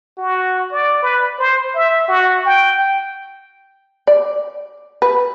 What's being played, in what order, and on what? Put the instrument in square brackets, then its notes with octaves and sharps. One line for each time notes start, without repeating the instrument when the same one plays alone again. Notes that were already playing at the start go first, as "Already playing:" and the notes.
[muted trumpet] F#4
D5
B4
C5
E5
F#4
G5
[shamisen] D5
B4